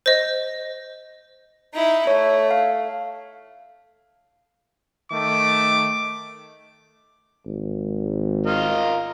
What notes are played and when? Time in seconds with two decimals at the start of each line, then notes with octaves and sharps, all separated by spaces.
0.06 C5 D#5
1.73 D#4 E4
2.07 A3 C#5
2.51 F5
5.12 D#3 A3 D6
7.45 G#1
8.46 F4 A#4 D#5